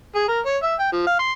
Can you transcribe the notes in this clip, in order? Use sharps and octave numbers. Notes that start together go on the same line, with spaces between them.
G#4
A#4
C#5
E5
G5
F3
F5
C6